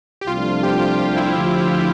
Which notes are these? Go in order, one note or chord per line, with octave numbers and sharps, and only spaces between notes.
G4
C2 C3 F3 A3 D4 F4
F4
G4
F4
F4
E4
D2 D3 F3